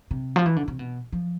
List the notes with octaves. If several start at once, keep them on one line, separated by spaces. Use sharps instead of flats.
C3
F3
E3
D3
C3
B2
F3